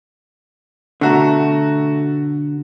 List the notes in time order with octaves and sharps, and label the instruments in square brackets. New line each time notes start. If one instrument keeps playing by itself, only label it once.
[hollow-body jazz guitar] B2 D3 [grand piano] A3 F#4 A#5